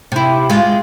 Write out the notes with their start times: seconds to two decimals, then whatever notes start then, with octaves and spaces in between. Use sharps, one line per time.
0.12 C3 E4
0.50 G#3 F4